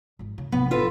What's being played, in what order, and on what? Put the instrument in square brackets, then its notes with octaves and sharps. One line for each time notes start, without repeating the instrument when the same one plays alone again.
[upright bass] G#1 D#3
C#3
[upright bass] A1 C3 [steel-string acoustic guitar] B3
[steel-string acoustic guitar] F4 A4 B4